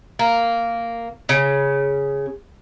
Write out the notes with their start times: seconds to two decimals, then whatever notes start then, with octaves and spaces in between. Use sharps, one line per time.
0.19 A#3
1.29 C#3